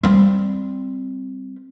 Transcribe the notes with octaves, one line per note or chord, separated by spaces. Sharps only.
G3 C4